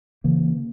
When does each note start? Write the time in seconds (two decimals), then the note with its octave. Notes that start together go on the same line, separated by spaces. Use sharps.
0.24 C#3 E3 A#3